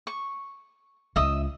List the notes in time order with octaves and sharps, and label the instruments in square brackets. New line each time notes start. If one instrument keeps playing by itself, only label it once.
[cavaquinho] C#6
[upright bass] C#2 [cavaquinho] D#5 E5 D#6